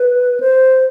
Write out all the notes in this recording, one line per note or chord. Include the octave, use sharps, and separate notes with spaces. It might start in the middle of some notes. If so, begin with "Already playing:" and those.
Already playing: B4
C5